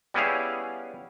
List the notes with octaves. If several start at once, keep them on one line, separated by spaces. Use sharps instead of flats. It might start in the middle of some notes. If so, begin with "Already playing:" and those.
G3 B3 C#4 E4 G#4 F5